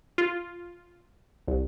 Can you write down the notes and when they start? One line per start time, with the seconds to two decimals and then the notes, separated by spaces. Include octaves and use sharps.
0.18 F4
1.48 C2